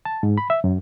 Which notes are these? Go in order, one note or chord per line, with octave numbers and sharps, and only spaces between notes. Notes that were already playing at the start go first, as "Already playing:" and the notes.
A5
G#2
B5
E5
F#2